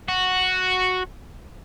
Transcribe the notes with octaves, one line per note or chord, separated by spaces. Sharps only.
F#4